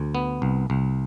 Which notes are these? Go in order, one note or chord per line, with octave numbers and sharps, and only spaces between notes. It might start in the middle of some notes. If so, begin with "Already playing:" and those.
Already playing: D2
B3
C2
C2